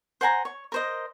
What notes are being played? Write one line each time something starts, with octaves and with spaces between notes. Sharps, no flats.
C5 F#5 G#5 A#5
C#5
A#4 C5 D#5